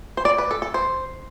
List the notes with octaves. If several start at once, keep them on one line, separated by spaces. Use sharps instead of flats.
C5
D5
B4
A4
A4
C5